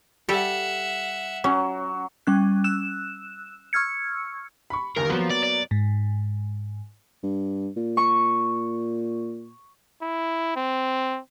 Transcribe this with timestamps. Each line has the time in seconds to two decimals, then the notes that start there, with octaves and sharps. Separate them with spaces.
0.29 G3 G4 A4 E5 F#5
1.44 F#3 C#4
2.27 G3 C#4 F#6
2.64 E6 F#6 E7
3.73 C#6 E6 F6 G#6 C#7
4.70 B5 C#6
4.97 G1 D#2 A#4
5.10 F3 F#3 A#3 B3
5.30 D5
5.43 D5
5.71 G#2
7.23 G2
7.77 A#2
7.97 C#6
10.02 E4
10.56 C4